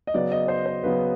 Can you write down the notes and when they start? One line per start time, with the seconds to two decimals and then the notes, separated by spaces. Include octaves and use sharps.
0.07 D#5
0.14 C#3 F#3 B3 D5
0.32 D#5
0.48 C5
0.66 C5
0.83 C#3 F#3 B3 B4